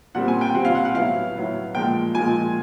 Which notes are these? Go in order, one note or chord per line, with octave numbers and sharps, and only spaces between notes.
A#2 G3 C4 F#5
G#5
G5
A#2 G3 C4 F#5
F5
F#5
F#5
A2 F#3 B3 E4 F5
A2 F#3 B3 E4
A#2 F3 G#3 G5
A#2 F3 G#3 G#5